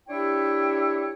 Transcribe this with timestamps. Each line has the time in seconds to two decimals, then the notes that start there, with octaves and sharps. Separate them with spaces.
0.08 D4 E4 G4 C#5 E5 G5